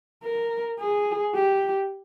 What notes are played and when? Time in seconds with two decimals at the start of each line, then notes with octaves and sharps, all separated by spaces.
0.24 A#4
0.79 G#4
1.35 G4